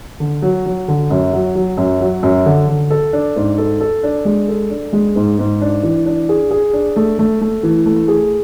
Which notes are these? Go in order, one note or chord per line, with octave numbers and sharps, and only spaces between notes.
D3
F#3
F#3
D3
F#2
F#3
F#3
F#2
F#3
F#2
D3
D3
A4
D4
G#2
A4
A4
D4
G#3
A4
D4
G#3
G#2
G#2
D4
E3
D4
G#4
G#4
D4
A3
A3
A3
E3
A3
G#4